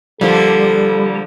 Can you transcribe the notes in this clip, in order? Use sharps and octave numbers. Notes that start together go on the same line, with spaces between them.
D3 F3 G3 A#3 A4